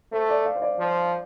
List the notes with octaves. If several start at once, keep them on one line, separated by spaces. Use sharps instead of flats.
A3 C5
D5
F5
C5
D5
F3